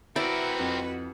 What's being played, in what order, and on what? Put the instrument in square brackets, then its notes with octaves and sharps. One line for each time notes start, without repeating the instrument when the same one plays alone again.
[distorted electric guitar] C4 A#4 [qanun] E4 D5 [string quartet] F#4 B4 [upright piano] E5
[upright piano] F2